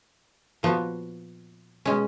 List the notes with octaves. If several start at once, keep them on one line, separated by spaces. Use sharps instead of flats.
A#2 F3 B3 F#4
B2 G#3 C#4